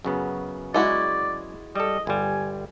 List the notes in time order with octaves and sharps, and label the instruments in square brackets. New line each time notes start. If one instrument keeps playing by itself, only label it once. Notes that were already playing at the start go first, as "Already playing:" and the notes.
[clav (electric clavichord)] F#2 C#3 B3
[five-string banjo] G#3 E4 F#4 [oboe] D5
[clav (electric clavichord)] G3 A4 [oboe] D#5
[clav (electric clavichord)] G1 G3 [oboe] G#5